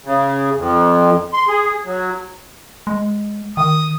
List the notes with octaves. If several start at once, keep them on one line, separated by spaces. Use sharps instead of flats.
C#3
F2
C6
G#4
F#3
G#3
D#3 D#6